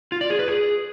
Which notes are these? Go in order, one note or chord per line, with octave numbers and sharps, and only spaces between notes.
F4
D5
G#4
B4
G#4